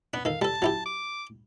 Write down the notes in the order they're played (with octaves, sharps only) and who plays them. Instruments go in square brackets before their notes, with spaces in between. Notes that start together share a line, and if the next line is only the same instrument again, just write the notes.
[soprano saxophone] B3 [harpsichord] D4
[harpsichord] D#3 A4 [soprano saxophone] F5
[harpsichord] G3 A4 [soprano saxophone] A5
[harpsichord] F#3 E4 G4
[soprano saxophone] D6